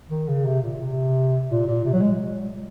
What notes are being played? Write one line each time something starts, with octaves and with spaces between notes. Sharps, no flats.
D#3
C#3
C3
A#2
C3
A#2
A#2
C3
F#3
G#3